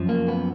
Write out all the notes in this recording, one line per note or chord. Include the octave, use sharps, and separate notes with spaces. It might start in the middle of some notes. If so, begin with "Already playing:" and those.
Already playing: F#2 F3
A#3
B3